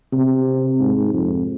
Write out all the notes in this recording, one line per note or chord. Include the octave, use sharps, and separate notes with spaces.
C3
G#2
F2